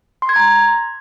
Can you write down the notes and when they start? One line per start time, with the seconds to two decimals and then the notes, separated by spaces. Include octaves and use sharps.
0.22 C6
0.29 G#6
0.36 A#5